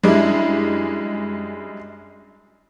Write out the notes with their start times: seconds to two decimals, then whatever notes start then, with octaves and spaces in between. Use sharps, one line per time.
0.03 F#2 G3 G#3 D4 E4